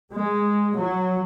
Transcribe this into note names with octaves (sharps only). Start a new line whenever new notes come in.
G#3
F#3